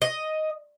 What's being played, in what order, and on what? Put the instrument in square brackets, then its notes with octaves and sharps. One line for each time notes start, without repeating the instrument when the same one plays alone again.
[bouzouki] D#5